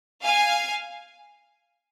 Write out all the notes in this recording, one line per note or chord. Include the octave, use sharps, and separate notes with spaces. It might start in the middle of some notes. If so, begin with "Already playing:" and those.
F5 G#5